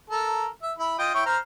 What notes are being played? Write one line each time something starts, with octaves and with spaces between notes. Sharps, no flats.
A4 A#4
E5
E4 B5
F4 D#5 G5
E4 C#5 G5
C5 A#5 F6